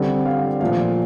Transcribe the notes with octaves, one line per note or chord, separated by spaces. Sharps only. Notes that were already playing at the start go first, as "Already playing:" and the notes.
Already playing: D3 G3 C4 D5
F5
A#2 F3 A3 F5